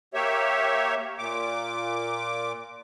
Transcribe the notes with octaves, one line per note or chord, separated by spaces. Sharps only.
A#3 G4 C#5 E5
A#2 D6